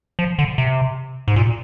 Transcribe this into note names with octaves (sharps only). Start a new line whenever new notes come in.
F3
D3
C3
G#2
A#2